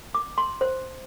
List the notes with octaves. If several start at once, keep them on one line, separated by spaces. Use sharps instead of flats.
D6
C6
C5